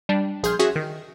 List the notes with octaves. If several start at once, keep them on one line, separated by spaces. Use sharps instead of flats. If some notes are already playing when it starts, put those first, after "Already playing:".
G3 D4
A#1 G#4 C6 F6 G6
C#4 F#4 G#4 E5
D#3